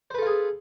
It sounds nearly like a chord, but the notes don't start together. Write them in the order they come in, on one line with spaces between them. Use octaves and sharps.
C5 B4 A4 F4 G#4